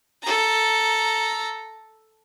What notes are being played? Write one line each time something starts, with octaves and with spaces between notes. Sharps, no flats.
A4 A#5